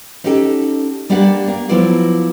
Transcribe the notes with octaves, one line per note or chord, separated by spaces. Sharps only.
C#4 D#4 F#4 G4 A4
G3 A#3 D4 G4 A#4 F#5
A#3
F3 F#3 B3 E4 F4 D5